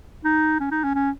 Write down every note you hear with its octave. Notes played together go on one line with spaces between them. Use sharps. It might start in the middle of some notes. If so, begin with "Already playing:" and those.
D#4
C#4
D#4
C#4
C#4